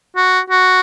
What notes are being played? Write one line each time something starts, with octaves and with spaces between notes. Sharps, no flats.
F#4
F#4